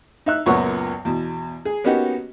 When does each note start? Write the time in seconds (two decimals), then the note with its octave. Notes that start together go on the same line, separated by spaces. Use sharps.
0.26 D#4 E5 F#6
0.46 C#2 F#2 A#2 B3 C#5 F#5
1.05 E2 B2
1.65 G#4
1.84 A#3 B3 C#4 D#4 F#4 G4